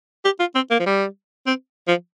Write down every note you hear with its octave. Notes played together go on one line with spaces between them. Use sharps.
G4
F4
C4
A#3
F3
G3
C4
F3